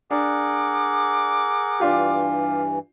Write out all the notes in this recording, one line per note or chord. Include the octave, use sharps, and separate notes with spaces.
D4 G#4 A#4 F#5 D6
G2 E3 D4 F4 G4